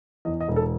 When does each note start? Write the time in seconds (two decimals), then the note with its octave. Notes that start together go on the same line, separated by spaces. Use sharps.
0.25 E2 D#5
0.40 D#5
0.48 E1
0.56 A4